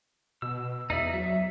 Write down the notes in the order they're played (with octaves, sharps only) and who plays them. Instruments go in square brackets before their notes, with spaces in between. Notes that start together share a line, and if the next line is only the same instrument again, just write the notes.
[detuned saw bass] B2 [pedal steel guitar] E6
[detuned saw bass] E2 [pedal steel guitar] D#4 D5 E5
[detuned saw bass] F#3 [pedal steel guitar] E5